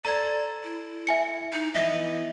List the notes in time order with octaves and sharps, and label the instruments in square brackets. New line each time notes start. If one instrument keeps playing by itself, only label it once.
[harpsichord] A4 C5 [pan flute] D5 [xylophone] A#5 G#6
[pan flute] E4
[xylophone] E5 G#5 C#7
[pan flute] D#4
[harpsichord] E3 B3 [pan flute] D#5